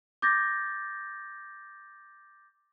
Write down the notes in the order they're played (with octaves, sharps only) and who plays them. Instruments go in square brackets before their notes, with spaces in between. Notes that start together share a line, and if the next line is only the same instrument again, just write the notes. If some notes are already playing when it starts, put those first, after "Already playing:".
[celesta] D6 G6 A6 A#6